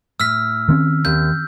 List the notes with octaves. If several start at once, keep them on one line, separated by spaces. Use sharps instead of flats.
A2 E6 F6 B6
D#3 C4 C#4
D#2 G6